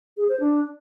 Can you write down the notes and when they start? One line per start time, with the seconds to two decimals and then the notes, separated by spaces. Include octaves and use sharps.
0.17 G#4
0.29 C5
0.40 D4